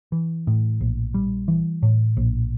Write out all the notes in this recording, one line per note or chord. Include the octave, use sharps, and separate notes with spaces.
E3
A2
A#1
G3
E3
A2
A#1